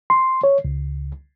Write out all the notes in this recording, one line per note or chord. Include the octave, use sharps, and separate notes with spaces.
C6
C#5
C#2